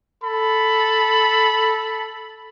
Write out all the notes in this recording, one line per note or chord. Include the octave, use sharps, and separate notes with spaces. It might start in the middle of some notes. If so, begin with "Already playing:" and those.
A4 B5